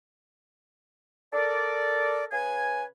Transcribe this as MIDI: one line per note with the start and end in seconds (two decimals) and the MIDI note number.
1.33 2.26 69
1.33 2.26 70
1.33 2.26 74
2.32 2.84 49
2.32 2.84 71
2.32 2.84 80